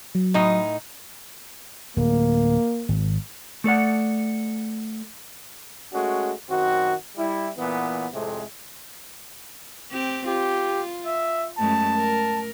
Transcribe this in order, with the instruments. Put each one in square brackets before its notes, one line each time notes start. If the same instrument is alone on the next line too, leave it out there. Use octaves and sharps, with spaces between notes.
[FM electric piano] F#3
[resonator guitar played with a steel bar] A2 D#4
[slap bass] D1 [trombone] A#3
[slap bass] G#1
[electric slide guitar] A3 A4 D5 F#5
[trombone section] G#3 A3 C#4 F#4
F#2 D#3 C4 F#4
G3 E4
A#2 E3 B3
F2 A2 C3 G#3 A3
[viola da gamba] C4 G4
[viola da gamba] F4 [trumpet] G4
[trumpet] E5
[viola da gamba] F#2 G#3 A3 [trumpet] A5
[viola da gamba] A#4